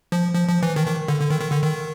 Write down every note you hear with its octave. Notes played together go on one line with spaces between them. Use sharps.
F3
F3
F3
E3
D#3
D#3
D3
D3
D#3
D#3
D3
D#3